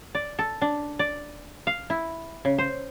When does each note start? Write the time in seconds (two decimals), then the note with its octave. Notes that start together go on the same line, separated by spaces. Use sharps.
0.15 D5
0.39 A4
0.61 D4
0.99 D5
1.67 F5
1.90 E4
2.45 C#3
2.58 C5